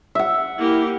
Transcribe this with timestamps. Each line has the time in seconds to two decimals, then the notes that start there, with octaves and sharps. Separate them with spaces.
0.15 E5 F#5
0.58 A#3 E4 G4